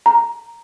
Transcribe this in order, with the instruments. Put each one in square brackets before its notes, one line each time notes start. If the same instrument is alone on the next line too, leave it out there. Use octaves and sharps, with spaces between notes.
[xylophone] A#5